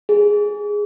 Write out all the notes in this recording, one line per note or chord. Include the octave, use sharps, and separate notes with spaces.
G#4